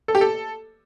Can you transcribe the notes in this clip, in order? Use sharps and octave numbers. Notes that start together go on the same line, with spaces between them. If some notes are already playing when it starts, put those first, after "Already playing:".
A4
G4
A4